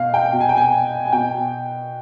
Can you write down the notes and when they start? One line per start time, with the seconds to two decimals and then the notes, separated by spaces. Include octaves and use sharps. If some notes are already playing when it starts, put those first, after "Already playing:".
Already playing: B2 F5
0.14 G5
0.33 B2
0.40 G#5
0.49 G5
0.57 G#5
1.05 G#5
1.12 B2 G5